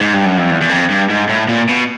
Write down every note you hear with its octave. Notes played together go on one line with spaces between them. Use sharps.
G#2
G2
F#2
F2
E2
E2
F2
G2
G#2
A2
A#2
B2